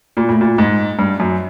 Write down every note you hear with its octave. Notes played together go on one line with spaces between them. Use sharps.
A#2
A2
A#2
G#2
G2
F#2